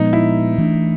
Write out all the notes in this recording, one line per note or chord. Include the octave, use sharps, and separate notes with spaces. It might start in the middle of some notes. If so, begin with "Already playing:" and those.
Already playing: A#2 F3 G#3 B3 D#4
E4
E3 A3 D4